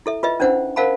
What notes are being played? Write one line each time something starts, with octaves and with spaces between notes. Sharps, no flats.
E4 A4 E5
F4 B4 D#5 E5
C#4 D4 E4 C5 F#5
A#4 C5 F5 F#5 A5 B5